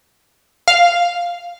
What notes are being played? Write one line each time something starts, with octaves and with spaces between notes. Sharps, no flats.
F5